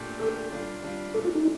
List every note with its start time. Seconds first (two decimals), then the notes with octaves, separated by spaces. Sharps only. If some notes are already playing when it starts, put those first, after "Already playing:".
Already playing: A#2 A3 D4 G4
0.20 A#2 A3 D4 G4 A4
0.51 G3 D4 F4
0.83 G3 D4 F4
1.13 A#2 A3 D4 A4
1.24 F4
1.35 D#4